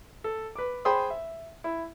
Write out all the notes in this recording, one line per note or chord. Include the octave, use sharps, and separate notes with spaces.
A4
B4 D6
G#4 C5 G5 B5 C6 D#6
E5
E4